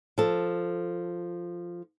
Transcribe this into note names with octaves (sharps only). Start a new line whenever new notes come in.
F3 A4